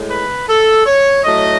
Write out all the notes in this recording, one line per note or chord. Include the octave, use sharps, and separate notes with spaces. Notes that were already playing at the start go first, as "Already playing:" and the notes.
Already playing: A2 G#3
B4
A4
C#5
A2 F#3 A3 D#5